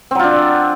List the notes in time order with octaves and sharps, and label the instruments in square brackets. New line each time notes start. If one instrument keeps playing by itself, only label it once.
[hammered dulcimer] C4
F#3
F4
D4